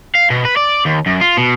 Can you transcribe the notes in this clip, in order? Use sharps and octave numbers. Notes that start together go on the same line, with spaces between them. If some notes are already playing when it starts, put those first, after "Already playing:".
F5
B2
B4
D5
D#2
F#2
F4
B2